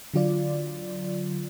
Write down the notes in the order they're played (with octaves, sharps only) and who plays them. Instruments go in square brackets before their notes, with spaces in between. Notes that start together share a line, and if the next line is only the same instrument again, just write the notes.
[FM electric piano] D3 F#3 F4 D5